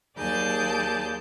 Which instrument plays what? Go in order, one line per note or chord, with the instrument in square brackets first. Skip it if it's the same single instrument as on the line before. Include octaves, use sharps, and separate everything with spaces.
[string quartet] D#2 F#3 G#4 D5 A5 G6